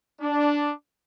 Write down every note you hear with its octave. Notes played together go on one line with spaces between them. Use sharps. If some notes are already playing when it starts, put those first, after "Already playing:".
D4